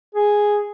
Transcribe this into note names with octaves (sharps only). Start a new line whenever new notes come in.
G#4